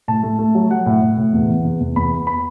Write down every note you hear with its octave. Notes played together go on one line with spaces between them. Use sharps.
A2 A5
A3
A3
F#3
F#3 F#5
A2
A2
A2
E2
E3
E2
E2
E2 B5
B3
B5